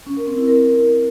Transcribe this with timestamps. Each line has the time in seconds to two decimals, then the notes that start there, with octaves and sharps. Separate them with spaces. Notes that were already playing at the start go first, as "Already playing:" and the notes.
0.06 C#4
0.17 A#4
0.27 C4
0.37 E4
0.48 A#4